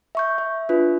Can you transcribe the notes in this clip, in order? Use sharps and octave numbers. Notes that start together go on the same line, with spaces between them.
E5 C#6 G6
E5
D4 F4 B4